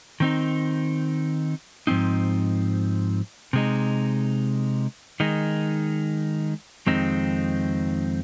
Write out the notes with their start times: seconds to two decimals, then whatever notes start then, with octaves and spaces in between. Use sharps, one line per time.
0.20 D#3 C4 D#4
1.87 G#2 F3 C4 D#4
3.53 C3 G#3 D#4
5.20 D#3 G#3 D#4
6.87 F2 D#3 G#3 C4 D#4